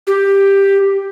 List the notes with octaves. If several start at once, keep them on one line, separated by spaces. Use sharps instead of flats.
G4